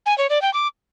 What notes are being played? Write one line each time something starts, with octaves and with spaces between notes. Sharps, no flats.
G#5
C#5
D5
G5
D6